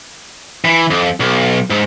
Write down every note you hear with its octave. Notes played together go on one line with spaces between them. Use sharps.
E3
F2
B1
G#2